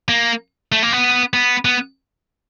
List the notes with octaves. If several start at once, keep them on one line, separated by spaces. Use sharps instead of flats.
A#3
A3
A#3
B3
B3
B3